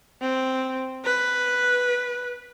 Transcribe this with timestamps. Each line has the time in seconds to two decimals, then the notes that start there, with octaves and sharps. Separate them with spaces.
0.22 C4
1.05 B4